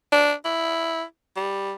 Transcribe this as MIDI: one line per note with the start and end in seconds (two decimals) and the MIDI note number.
0.12 0.32 62
0.45 1.03 64
1.36 1.74 55